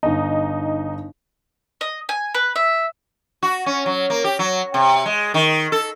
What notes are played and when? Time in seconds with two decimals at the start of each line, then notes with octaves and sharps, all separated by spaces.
0.03 G1 D#4
1.81 D#5
2.09 G#5
2.35 B4
2.56 E5
3.43 F#4
3.66 C#4
3.86 F#3
4.10 A#3
4.24 G4
4.39 F#3
4.74 C3
5.05 G#3
5.34 D#3
5.72 A4